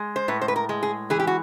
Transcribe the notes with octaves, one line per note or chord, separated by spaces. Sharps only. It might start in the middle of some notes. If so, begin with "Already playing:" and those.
Already playing: G#3
C5
A2 B4
C5
B4
A#4
G#3
G#4
E3 G#4
G4
F#4